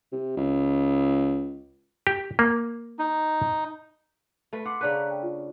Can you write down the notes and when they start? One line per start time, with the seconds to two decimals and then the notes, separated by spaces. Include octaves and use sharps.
0.12 C3
0.37 C#2
2.07 G4
2.39 A#3
2.99 D#4
4.53 A3 B4
4.65 F#5 C6 D6 C7
4.81 C#3 D4 B4 A#5 F#6
5.11 G5
5.23 F4